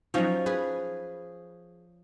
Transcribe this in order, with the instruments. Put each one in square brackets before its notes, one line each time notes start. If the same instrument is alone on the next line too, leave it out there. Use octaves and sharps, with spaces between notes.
[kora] F3 C#4 [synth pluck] F#3 D#4
[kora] G#4 [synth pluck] B4